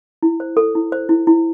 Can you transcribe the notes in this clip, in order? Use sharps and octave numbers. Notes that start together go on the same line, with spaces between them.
E4
C5
A4
E4
C5
E4
E4